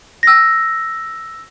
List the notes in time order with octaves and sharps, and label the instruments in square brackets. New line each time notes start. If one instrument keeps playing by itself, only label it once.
[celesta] E6 A#6